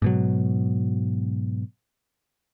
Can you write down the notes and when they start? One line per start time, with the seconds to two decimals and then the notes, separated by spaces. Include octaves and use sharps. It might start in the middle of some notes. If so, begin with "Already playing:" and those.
0.02 G#2 B2 F#3